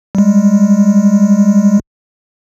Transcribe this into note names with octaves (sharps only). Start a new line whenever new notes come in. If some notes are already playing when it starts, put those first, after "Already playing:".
G3 G#3